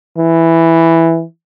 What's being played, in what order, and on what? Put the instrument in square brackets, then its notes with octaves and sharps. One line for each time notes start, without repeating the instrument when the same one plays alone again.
[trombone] E3